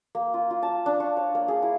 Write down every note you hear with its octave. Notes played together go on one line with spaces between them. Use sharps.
A#3
F4
F4
A5
D4
C#6
C#5
A#3
G#4
E4